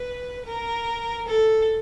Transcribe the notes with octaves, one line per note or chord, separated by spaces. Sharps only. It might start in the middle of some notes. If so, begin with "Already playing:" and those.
Already playing: B4
A#4
A4